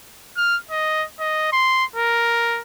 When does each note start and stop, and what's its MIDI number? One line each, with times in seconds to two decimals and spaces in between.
0.37 0.58 89
0.71 1.05 75
1.20 1.48 75
1.53 1.85 84
1.96 2.61 70